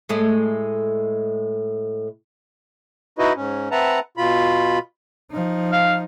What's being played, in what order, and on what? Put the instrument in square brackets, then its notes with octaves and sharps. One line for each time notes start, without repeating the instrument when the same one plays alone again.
[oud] A2 G#3 A3
[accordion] D#4 E4 F#4 B4 D#5
G#2 C#4
C4 B4 E5 F#5 A5 A#5
B2 F4 B5
[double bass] F3 D#4
[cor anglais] F5